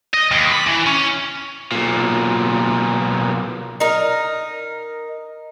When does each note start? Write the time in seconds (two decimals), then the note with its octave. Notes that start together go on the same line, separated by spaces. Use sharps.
0.14 D#5
0.31 D#2
0.52 B5
0.67 E3
0.87 C#4
1.72 B1 A#2
3.80 D#4 A#4